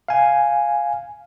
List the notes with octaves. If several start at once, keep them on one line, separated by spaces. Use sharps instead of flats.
F5 G#5